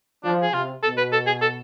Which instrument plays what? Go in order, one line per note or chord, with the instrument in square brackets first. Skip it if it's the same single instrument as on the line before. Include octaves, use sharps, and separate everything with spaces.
[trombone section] F3 [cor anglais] D4
[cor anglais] G#4
[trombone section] C3 [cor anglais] F4
[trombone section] B2 [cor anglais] A4
[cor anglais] B4
A4
G#4
A4